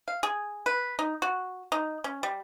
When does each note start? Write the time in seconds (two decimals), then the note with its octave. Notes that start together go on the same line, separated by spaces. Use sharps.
0.08 F5
0.23 G#4
0.66 B4
0.99 D#4
1.22 F#4
1.72 D#4
2.04 C#4
2.23 G3